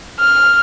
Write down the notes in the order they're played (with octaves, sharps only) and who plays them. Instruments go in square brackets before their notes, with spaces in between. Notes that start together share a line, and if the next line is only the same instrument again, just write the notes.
[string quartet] F6